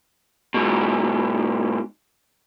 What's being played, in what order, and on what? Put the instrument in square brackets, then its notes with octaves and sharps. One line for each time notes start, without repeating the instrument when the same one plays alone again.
[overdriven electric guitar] G#2 B2